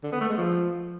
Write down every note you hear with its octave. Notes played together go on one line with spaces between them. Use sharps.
D3
B3
A3
G#3
F3